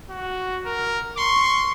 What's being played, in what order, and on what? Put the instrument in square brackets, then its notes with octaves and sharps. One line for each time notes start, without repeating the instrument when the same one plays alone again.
[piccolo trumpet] F#4
A#4
[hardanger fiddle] C6 [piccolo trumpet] C#6